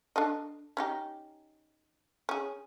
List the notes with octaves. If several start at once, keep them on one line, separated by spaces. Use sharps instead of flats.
D4 A4 D#5
C#4 D#4 G4
C#4 G#4